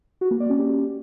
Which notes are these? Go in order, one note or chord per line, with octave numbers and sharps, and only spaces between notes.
F#4
A#3
D5
C#4
G4